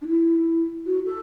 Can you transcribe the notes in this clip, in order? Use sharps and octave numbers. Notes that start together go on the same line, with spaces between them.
D4
E4
F#4
A4